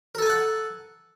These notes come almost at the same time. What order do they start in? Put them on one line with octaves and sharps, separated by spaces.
A#4 A4 G#5 A5 F#5